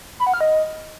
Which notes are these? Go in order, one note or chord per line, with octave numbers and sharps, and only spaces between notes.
B5
F#5
F6
D#5